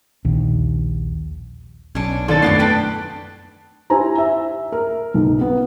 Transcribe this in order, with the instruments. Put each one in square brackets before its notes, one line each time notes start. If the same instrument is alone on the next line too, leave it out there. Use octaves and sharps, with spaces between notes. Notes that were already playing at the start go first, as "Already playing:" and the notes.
[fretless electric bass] A#1 D#2
[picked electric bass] B1 [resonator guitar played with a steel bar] C#4 D4
[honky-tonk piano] D#2 D4 A6 [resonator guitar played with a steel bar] A4
[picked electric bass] F#2 A3 [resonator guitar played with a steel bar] A#2 E3 B3 [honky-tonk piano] A6 C7
[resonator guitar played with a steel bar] D4 B4 G5
[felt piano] E4 G4 C5 G#5 A#5
E5
A#4
B1
B3